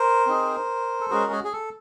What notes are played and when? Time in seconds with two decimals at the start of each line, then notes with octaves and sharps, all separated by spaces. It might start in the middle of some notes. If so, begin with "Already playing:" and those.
Already playing: A#4 C5
0.27 C4 D#4 G#4
1.01 A4
1.10 G#3 C#4 F#4 G#4 A#4
1.32 G#4
1.44 G#4
1.53 A4